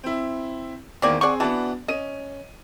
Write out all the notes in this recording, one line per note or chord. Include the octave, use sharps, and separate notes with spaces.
C4 E4
E2 D#3 A#3 C4 D5 G#5
C4 G#4 D5 F#5 G#5 C#6
E3 B3 D4 F#4 A5
C#4 D#5 D#7